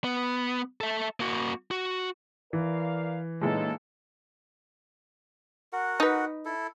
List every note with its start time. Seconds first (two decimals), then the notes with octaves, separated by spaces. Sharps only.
0.04 B3
0.81 A4 E5
1.20 A#3 F#4
1.71 F#4
2.53 E3 A#4 D5 F5
3.41 A#2 E3 G#3 C#4 D#4 A4
5.73 F#4 A#4 F#5
6.00 D#4 B4
6.45 E4 A4